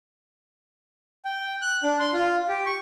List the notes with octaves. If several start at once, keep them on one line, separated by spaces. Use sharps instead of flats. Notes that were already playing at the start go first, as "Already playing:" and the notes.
G5
F#6
D4
C6
F4
G4
C#6